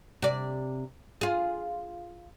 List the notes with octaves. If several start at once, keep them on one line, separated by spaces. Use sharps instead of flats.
C3 D5
F4 G#4